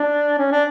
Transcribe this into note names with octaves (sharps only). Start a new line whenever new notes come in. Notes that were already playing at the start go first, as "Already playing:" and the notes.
Already playing: D4
C#4
D4